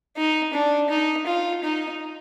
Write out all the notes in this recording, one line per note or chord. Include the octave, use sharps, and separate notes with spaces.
D#4
D4
D#4
F4
D#4